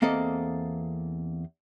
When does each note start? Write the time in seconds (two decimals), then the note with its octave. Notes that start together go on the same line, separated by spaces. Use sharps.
0.02 E2 A#3 C4 A4 D#5